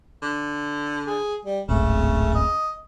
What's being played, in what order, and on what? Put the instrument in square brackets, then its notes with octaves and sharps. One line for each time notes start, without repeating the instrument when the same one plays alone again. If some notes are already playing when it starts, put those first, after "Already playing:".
[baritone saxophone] D3
[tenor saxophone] G#4
G3
[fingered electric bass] D1 G#1 [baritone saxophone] C#3 [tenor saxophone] A3
[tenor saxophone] D#5